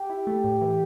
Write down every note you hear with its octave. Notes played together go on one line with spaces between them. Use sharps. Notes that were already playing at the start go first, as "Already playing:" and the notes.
Already playing: G4
E4
A3
A2
E3